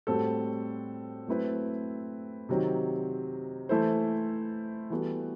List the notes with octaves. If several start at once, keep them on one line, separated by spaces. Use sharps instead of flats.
A2 G3 C4 F#4 A4
F#3 A3 C4 E4 B4
C3 D#3 F#3 C4
E3 A3 E4 A4 C5
E3 G3 B3 F#4 A4